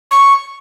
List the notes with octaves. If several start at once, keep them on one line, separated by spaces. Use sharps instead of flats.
C#6